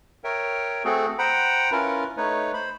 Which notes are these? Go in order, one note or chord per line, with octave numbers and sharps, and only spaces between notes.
A#4 C#5 E5 G5
A3 C4 F#4 G#4 A4
C5 F#5 G5 A#5 B5
C#4 E4 F4 A#4 B4
A3 D#4 B4 C#5
C5 B5